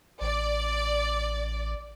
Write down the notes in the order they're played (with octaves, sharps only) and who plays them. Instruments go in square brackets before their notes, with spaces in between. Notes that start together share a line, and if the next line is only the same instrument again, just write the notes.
[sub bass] A1 [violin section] D5